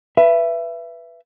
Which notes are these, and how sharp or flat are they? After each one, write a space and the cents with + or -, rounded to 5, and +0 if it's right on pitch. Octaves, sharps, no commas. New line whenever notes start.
B4 +0 E5 +25